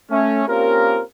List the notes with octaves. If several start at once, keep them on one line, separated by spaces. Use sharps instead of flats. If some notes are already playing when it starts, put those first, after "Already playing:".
A3 C#4
A#3 C4 C#4 F4 G4 A#4